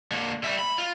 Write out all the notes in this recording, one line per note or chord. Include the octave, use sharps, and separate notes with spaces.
D3 A#3
G3 E5
B5
F4